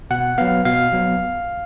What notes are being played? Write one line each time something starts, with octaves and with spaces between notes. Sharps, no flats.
B2 F#5
F#3 B3 F5
B2 F5
F#3 B3